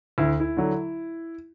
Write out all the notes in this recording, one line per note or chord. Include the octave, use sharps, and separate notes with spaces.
D2 E4
E4
D3 F#3